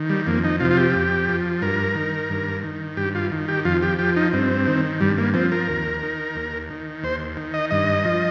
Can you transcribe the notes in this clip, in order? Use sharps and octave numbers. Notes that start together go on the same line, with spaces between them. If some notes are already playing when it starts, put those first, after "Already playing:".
Already playing: D#3
G3
F2 A#3
D#4
C3 F3 F4
F4
G4
F2
F3
G2 A#4
D#3
G2
D#3
G2 G4
F4
D#3
G4
F2 F4
G4
F3 G4
D#4
G2 C4
D#3
G2 G3
A#3
F3 C4
A#4
D#2
D#3
D#2
D#3
D#2 C5
D#3
D#5
G2 D#5
F3